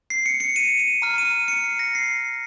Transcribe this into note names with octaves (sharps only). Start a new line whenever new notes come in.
C7
C#7
C#7
D#7
D#7
A#5 F6
D#7
D#7
C#7
C7
A#6
C7